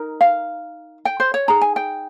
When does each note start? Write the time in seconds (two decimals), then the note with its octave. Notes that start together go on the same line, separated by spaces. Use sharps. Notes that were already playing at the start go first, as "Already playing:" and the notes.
Already playing: D#4 A#4
0.21 F5
1.05 G5
1.20 C5
1.34 C#5
1.48 D#4 G#4 A#5
1.61 G#5
1.76 G5